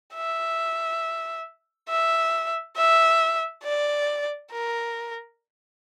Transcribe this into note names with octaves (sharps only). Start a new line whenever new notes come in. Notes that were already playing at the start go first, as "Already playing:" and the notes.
E5
E5
E5
D5
A#4